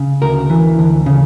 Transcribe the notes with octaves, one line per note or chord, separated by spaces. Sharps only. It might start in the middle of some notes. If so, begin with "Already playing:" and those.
Already playing: C#3
D2 A#4
E3
D2
C#3